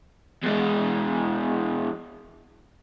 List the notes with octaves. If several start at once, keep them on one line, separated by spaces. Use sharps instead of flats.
E2 G#3